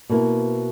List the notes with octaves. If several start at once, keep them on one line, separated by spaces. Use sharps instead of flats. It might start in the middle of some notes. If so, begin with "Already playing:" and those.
B2 A#3 E4